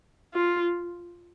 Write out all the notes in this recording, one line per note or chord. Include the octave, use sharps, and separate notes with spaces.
F4